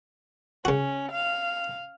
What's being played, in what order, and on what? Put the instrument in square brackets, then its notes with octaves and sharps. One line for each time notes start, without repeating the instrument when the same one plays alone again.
[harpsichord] C#3 F#4 [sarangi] C#4
[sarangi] F5